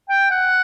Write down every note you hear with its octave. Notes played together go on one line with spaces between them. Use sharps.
G5
F#5